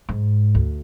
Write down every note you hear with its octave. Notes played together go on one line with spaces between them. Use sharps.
G#2
D2